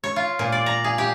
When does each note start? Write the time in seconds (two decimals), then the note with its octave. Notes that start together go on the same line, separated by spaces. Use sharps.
0.04 C#5
0.16 F4
0.39 A#2
0.52 D5
0.66 A#5
0.84 G#4
0.98 G4